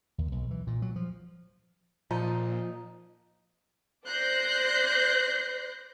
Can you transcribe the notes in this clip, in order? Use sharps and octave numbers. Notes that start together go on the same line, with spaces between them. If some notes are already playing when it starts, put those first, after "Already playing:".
D#2
B1
E3
A#2
F#3
F3
A#2 F3 D#4
C5 D5 F#6 G6 A#6 C7